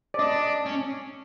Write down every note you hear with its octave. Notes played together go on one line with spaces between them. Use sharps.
D5
D4 D#5
C#4